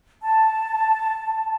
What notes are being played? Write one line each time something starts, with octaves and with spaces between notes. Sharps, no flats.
A5